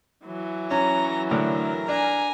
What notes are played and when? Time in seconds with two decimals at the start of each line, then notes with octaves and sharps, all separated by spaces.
0.25 E3 F#3
0.71 C#4 A#5
1.31 A2 D3 A#4
1.89 D4 G#5 A#5